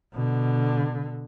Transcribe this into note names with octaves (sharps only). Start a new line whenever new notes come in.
B2 D3